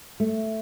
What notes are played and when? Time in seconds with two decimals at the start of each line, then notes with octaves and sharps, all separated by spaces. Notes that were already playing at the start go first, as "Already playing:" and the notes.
0.20 A3